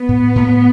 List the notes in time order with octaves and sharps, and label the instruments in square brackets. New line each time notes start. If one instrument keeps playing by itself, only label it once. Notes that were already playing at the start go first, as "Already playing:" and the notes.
Already playing: [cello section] B3
[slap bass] A2
A2